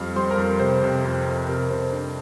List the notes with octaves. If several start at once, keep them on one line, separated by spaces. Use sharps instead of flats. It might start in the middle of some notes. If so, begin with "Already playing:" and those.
Already playing: F2 G3 F5 F6
G3 C5 C6
A#4 A#5
F2
C3 C5
C3
F2
F2
C3 A#4
C3 C5
D4